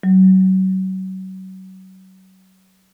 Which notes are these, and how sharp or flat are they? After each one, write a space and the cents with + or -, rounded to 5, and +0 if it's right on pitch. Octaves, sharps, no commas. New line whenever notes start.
F#3 +30